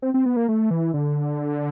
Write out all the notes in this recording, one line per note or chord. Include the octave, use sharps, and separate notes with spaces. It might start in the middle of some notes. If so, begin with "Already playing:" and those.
C4
C4
B3
A#3
A3
E3
D3